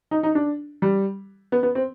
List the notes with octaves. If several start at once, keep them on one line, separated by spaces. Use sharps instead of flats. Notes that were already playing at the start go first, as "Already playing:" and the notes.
D#4
D#4
D4
G3
B3
B3
C4